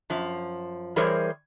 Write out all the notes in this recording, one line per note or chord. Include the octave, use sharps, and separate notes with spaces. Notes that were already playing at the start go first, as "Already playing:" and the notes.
F#2 F3
E3 G3 G#4 A#4 C5 C#5